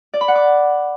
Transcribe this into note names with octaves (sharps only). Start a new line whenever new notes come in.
D5
B5
F#5
D6